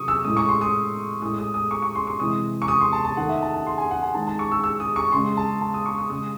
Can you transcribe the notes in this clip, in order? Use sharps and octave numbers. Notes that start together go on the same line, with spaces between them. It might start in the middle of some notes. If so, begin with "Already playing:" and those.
Already playing: C3 F#3 A3 C#6 D#6
E6
A2 G#3 D#6
C#6
C6
D#6
A2 G#3 D#6
D#6
D#6
C#6
C#6
C6
C#6
C3 E3 G#3 D#6
C#6
D#6
C6
A5
A5
D#3 A3 F#5
E5
A5
A5
C6
G#5
F#5
G#5
D#3 G#3 A5
A5
C#6
E6
E6
D#6
C#6
C#3 G#3 C6
A5
A5
D#6
C#6
D#6
C#3 G#3 D#6